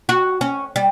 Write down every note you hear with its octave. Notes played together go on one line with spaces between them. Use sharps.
F#4
C#4
G3